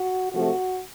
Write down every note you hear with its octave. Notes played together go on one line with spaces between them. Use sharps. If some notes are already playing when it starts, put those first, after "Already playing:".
Already playing: F#4
C3 F3 A3 F#4